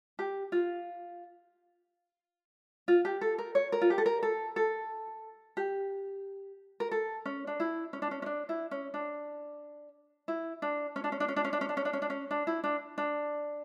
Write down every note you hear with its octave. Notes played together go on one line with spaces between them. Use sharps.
G4
F4
F4
G4
A4
A#4
C#5
A#4
F4
G4
A4
A#4
A4
A4
G4
A#4
A4
C#4
D4
E4
C#4
D4
C#4
C#4
D4
E4
C#4
D4
E4
D4
C#4
D4
C#4
D4
C#4
D4
C#4
D4
C#4
D4
C#4
D4
C#4
D4
C#4
D4
E4
D4
D4